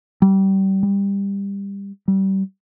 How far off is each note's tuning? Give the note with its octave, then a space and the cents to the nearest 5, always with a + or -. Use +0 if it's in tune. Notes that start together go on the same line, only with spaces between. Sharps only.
G3 -25
G3 +20
G3 -30